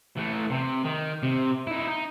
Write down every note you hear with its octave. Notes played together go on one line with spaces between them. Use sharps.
E3 A3
C3
D#3
C3
D#4 E4
D#4